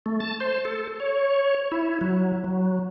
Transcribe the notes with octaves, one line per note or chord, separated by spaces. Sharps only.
A3
A5
C5
A4
C#5
E4
F#3
F#3